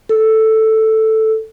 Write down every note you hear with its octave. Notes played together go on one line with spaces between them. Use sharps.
A4